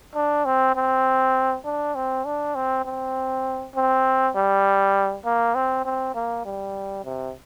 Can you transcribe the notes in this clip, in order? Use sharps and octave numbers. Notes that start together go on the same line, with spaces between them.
D4
C4
C4
D4
C4
D4
C4
C4
C4
G3
A#3
C4
C4
A#3
G3
C3